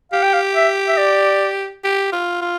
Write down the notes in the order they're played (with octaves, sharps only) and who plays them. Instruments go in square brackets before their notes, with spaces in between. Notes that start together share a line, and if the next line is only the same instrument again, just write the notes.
[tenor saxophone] G4 [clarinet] F5
[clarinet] G5
F5
E5
E5
D5
[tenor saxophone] G4
F4
F4